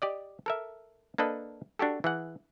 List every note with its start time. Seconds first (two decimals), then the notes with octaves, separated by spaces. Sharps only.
0.02 G4 D5 D#5
0.46 A4 A#4 E5
1.18 A#3 D4 A4 B4 D#5
1.79 D4 F#4 G4 A4
2.04 E3 G#4 F#5